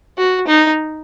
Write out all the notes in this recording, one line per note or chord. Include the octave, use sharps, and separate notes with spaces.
F#4
D#4